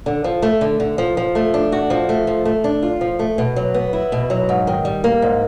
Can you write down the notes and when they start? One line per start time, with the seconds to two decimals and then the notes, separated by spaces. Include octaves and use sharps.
0.06 D3
0.24 F3
0.42 A3
0.61 D3
0.80 D3
0.98 F3
1.17 F3
1.35 A3
1.54 D4
1.72 F#4
1.90 F3
2.09 A3
2.27 F3
2.45 A3
2.64 D4
2.83 F4
3.01 F3
3.19 A3
3.38 B2
3.56 F#3
3.74 B3
3.93 E4
4.12 B2
4.30 F#3
4.49 G#2
4.67 D#3
4.85 G3
5.04 A#3
5.22 G#2